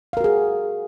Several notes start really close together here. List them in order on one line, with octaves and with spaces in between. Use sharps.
F5 A#4 F#4 G#4